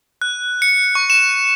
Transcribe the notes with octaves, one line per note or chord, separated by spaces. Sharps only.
F#6
C#7
C#6
E7